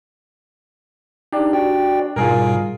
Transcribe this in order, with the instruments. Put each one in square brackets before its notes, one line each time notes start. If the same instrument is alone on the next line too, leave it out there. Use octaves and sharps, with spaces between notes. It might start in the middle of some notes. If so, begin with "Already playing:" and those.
[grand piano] D4 G4 [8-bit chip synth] D#4
[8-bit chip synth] F#4 D5 G5
[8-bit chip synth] G#2 B2 G3 [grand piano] F4 G#4 A#4